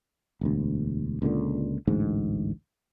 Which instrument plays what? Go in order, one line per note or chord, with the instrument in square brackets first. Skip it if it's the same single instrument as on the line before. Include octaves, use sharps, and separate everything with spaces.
[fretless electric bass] E1 D2
C#2 A#2 D3
A1 D2 G#2